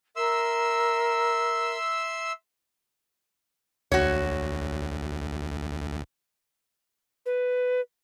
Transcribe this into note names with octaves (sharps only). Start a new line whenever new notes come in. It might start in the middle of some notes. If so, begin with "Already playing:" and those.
A#4 E5 C6 E6
D2 F#4 C#5
B4